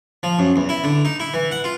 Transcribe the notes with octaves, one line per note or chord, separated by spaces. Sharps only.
F3
F#2
E2
E4
D3
D#4
E4
E3
F#5
F4